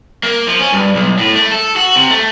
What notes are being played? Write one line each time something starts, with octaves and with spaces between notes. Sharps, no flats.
A#3
F3
C#4
G2
B1
A2
A3
A4
F#4
C3
A3